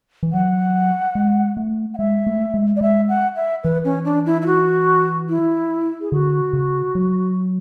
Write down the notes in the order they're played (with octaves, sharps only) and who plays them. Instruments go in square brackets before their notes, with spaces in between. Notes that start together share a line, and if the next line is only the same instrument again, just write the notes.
[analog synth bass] E3
[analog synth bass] F#3 [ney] F#5
[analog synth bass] G#3
A3
[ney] F#5
[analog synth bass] G#3 [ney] E5
[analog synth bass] A3
G#3
[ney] D5
[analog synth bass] G#3 [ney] E5
[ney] F#5
E5
[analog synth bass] E3 [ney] B4
[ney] C#4
D4
E4
E4
F#4
E4
G#4
[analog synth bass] D3 [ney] F#4
[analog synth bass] C#3
F#3